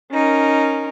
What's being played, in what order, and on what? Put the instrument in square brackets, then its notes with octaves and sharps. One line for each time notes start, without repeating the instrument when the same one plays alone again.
[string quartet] C#4 D#4 A#4